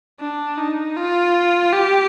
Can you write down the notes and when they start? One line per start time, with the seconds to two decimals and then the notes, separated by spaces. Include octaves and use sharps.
0.20 D4
0.58 D#4
0.97 F4
1.73 G4